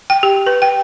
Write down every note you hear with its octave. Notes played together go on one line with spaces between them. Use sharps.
G5
G4
B4
G5